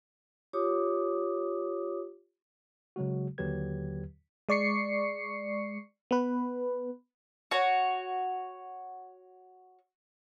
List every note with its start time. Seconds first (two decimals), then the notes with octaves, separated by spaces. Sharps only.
0.53 F4 G4 C#5 D6 D#6
2.96 C#3 F#3 G#3 F#4
3.38 D#2 D3 F#3 G4 B4 G#6
4.49 G#3 D5 C#6 C7 C#7
6.11 B3 B4
7.51 F#4 C#5